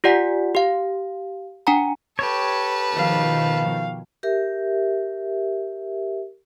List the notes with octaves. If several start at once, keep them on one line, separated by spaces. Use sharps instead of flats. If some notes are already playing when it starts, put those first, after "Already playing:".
F4 G4 D5 F#5 G#5 B6
G4 F5
D4 F#5 G#5 A#5
G4 A4 B4 C#5
B2 D#3 F3 F5
G4 A#4 E5